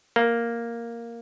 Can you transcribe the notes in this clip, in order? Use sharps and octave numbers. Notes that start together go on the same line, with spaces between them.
A#3